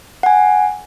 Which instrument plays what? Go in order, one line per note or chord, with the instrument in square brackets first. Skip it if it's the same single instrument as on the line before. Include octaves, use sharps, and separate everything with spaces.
[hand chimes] F#5 G#5